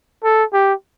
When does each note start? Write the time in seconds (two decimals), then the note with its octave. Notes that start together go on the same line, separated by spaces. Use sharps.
0.24 A4
0.53 G4